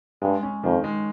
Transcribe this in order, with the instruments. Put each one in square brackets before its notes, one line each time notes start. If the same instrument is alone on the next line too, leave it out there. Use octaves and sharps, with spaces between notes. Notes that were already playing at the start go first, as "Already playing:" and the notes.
[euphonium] G2 [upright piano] G#3
[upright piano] C#4
[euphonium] F2 [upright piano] D#3
[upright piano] G#3